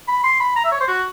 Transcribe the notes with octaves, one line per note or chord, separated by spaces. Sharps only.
B5
C6
B5
A#5
E5
C#5
C5
F#4